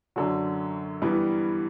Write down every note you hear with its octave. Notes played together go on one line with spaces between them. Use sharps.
F#2 D3 F#3
G2 E3 G3 B3